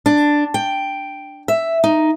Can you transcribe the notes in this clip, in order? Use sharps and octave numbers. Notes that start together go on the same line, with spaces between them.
D4
G5
E5
D#4